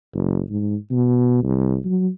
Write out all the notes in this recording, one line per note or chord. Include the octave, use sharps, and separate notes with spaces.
F#1
G#2
B2
C2
F#3